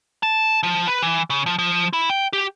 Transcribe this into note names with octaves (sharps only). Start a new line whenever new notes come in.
A5
F3
B4
E3
C#3
F3
F3
E4
G5
G4